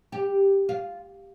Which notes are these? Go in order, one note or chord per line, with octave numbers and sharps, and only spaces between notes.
G4
F4